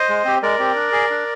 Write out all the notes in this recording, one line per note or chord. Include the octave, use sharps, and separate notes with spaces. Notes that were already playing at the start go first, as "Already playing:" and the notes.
Already playing: C5 D#5
G#3
C4 G4
G#3 A#4 D5
C4 G4
D4
G#4
D4